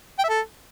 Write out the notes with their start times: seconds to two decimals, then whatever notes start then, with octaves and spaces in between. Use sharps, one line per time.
0.19 G5
0.24 E5
0.29 A4